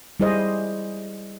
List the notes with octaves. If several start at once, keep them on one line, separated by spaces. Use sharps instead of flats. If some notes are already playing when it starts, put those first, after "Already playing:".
G3 E4 G#4 C5 D#5